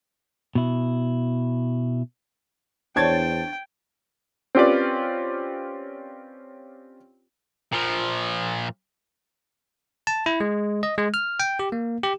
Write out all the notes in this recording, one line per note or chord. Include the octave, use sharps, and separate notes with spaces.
B2 E4
E2 D4 C5 C#5 G5 A5 G#6 A6
C4 C#4 F4 G4 B4 D5
A#2 F3
A5
E4
G#3
D#5
G#3
F6
G5
G4
A#3
G4